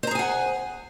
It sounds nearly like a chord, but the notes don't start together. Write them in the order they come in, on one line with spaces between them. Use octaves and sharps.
C5 A#5 G#4 G#5 F#5